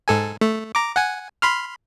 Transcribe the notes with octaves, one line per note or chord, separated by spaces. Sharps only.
G#2 A4 G#5
A3
A#5 D6
F#5 G#5
B5 C6 F6